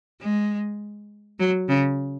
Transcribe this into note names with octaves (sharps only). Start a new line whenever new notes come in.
G#3
F#3
C#3